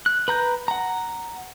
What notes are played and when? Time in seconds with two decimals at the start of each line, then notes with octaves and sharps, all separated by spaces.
0.06 F#6
0.28 B4 A#5 G6
0.68 F#5 A#5